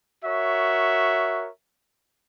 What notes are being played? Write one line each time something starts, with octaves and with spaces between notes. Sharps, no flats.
F#4 A#4 C#5 E5